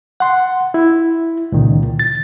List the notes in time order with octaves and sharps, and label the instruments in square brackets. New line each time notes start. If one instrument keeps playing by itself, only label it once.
[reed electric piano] F#5 C6
E4
C#2 A#2 D#3
A6